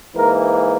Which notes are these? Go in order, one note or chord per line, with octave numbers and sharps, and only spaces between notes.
G#2 E3 A#3 A#4